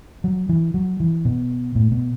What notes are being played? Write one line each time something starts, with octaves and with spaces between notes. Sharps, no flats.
F#3
E3
F#3
E3
B2
A2
B2